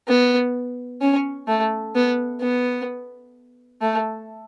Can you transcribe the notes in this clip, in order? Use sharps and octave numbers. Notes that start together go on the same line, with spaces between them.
B3
C#4
A3
B3
B3
A3